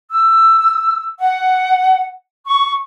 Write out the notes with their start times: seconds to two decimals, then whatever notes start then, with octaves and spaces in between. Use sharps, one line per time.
0.09 E6
1.19 F#5
2.46 C#6